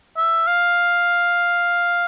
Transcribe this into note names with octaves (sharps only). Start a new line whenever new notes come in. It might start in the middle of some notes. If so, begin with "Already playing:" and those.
E5
F5